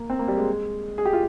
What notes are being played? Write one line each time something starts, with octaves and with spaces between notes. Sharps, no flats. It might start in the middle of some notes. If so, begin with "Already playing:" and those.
Already playing: A#3
C4
A#3
G3
G#3
G#4
G4
F4